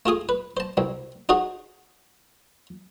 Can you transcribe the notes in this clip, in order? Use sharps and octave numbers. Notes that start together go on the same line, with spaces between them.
A3 F4 G#4 D#6
B4
C5 A5
C2 C4
D#4 F#4 G#4 C#5